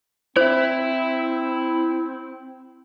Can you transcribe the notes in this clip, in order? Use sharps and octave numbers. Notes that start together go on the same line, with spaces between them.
C4 E4 C5 E5